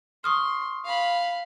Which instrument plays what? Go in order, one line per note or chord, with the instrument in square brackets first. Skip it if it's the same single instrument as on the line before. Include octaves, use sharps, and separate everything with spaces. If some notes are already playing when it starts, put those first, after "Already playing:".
[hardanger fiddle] C6 [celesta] C#6 D#6 F6
[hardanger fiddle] F5 B5